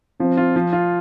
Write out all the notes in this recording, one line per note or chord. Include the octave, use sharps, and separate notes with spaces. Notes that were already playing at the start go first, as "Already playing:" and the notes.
F3 C4
F4
F3
F4